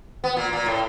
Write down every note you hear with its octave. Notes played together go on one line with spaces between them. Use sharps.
B3
A#2
A#2
A2